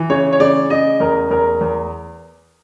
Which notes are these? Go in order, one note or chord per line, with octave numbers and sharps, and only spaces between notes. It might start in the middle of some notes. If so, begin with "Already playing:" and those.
Already playing: E3
C#3 C#5
C#5
C#3 D5
C#3 D#5
E2 A#4
E2 A#4
E2